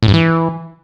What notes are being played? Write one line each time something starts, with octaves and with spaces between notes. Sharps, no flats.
A2
G2
E3